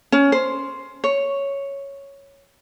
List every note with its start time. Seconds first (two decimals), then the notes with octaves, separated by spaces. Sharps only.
0.12 C#4
0.32 C5
1.04 C#5